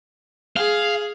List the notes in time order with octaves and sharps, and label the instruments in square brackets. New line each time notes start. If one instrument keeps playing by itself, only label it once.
[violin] G#4 [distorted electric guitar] F5